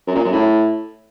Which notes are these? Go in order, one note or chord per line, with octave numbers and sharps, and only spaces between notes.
F#2
A#2
F#2
A2